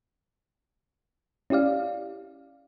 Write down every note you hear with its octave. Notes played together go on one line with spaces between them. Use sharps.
C#4 E4 G4 D5 F5